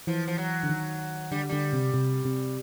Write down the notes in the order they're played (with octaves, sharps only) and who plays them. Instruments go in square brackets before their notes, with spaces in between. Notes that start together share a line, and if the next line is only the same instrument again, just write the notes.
[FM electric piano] E3 [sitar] F3
[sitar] F3
F#3
[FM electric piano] D3
D#3
[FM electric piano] D3 [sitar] G3
[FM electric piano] D3 [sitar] G3
[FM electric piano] C3
C3
C3